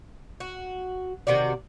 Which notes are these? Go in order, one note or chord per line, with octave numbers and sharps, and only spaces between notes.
F#4
C3 D#3 F#4 D5